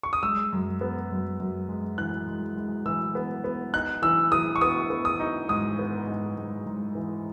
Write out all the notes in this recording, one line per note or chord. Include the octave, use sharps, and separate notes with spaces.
C#6
D#6
G#3 E6
F#2
B3
F#2
F#2
G#3
E3 F#6
G#3
G#3
E3 E6
B3
B3
D#4 F#6
E3 E6
E3 D#6
C#6
B3 D#6
B3
D#6
D#4
G#2 D#6
B3
G#2
G#2
G#2
E3